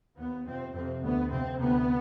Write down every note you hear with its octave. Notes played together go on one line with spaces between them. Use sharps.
D#2 B3
F2 C3 C4
F2 C3 C4
D2 C3 B3
F2 C3 C4
D2 C3 B3